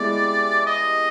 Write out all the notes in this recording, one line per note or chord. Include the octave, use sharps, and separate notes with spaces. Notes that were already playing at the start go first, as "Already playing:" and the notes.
Already playing: G#3 B3 E4 G4 D5
D#5